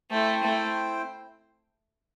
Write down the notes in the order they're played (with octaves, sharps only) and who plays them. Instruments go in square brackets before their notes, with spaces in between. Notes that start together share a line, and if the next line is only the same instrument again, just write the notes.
[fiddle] A3 [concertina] C4 E4 C5 G5
[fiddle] A3